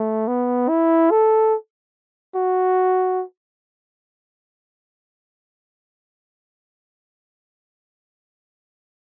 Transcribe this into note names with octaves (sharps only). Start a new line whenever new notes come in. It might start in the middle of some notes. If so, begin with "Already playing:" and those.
Already playing: A3
B3
E4
A4
F#4